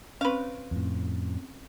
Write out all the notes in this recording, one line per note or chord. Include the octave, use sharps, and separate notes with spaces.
C4 C#4 B4 F5
F2 A2